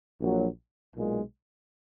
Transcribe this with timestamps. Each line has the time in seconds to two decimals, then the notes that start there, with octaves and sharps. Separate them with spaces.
0.20 A#1 A#2 F#3
0.95 B1 A#2 G#3